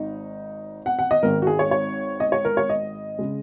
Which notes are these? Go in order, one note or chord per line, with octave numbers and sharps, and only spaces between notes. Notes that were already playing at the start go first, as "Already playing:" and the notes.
Already playing: G#1 D#4
F#5
F#5
D#5
G#1 G#2 D#3 A#4
F#4
G#4
C#5
C#5
D#5
C#5
A#4
C#5
D#5
C#3 G#3